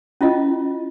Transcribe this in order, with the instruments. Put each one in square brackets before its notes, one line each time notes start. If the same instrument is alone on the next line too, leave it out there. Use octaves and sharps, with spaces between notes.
[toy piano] C#4 E4 F4 D#5